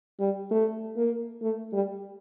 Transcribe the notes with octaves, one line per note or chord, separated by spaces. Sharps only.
G3
A3
A#3
A3
G3